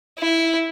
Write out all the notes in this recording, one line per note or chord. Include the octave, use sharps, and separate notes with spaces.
E4